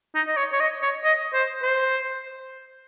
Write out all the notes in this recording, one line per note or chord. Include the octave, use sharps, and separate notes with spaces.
D#4
D#5
C#5
C#5
D#5
C#5
D#5
C5
C5